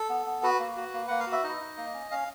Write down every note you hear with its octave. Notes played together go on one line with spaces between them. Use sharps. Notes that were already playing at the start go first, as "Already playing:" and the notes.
Already playing: A4
B3
B3
F#4 B4
A#3
F#4
A#3
A#3 F#5
F5
F#4
E5
D#4 D#5
D#4
A#3
C#4
C#4 F5